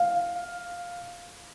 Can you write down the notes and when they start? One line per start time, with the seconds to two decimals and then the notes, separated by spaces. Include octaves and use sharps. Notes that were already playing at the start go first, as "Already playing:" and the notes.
Already playing: F5